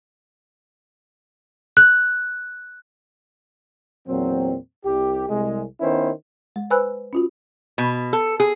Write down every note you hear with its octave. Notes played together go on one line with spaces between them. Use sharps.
F#6
E2 A#2 F#3 C4
C2 G4
C2 G#3
D#3 B3 C#4 E4 B4 C5
G#3
B4 C5 G#5 B5 E6 F#6
C#4 F4 F#4
B2
A4
G#4